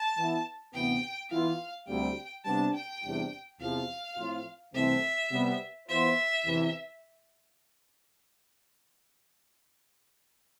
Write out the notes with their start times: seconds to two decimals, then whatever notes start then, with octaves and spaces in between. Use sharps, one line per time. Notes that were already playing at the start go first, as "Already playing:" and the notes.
Already playing: A5
0.16 E3 B3 E4
0.73 D2 C3 E3 B3 G5
1.30 E3 B3 F4 F5
1.88 D2 C3 G3 G5
2.45 C3 G3 B3 D4 A5
2.74 G5
3.02 E2 C3 G3 D4
3.60 E2 C3 F3 F5
4.17 A2 F3 C4 F4
4.74 C2 C3 E3 A3 C4 E5
5.32 C3 G3 B3
5.88 E3 B3 F4 C5 E5
6.46 E2 C3 E3